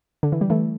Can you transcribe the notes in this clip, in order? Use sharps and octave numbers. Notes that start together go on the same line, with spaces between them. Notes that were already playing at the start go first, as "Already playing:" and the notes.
D3
E3
G3
E3 A3